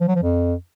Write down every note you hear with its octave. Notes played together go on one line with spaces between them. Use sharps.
F3
F#3
F3
F2